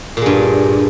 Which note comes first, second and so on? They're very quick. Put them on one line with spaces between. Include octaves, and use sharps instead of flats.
A#2 G#3 G2